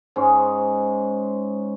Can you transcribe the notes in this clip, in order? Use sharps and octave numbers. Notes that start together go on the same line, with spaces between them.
G#2 G#3 C#4